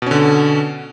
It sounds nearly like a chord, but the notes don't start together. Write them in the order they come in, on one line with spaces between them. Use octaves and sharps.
B2 C#4 D3